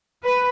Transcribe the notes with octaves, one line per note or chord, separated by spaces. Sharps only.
B4